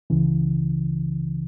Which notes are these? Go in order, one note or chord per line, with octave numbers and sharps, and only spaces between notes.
C#2 C#3 E3